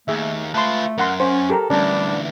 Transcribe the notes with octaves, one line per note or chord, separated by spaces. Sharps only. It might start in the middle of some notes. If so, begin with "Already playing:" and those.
D#2 A3 G#4 E5
A3 F4 B4 A5 C6
F#2 A#4 F#5 C6
C#4 C5
G4 A4 A#4 A#5
D2 E3 G3 C#4 D4 A5